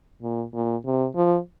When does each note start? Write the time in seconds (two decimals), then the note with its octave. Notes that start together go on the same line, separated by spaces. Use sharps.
0.22 A#2
0.54 A#2
0.85 C3
1.16 F3